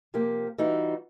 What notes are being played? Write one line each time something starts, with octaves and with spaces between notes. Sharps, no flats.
C3 F3 A#3 G4
E3 G3 D#4 F4 F#4